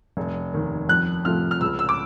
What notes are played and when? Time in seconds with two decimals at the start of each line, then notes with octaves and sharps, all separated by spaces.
0.17 F1
0.53 D#2 D#3
0.89 F2 F#6
1.25 C3 F3 A3 F6
1.51 F6
1.61 C#2 E6
1.79 E6
1.89 D6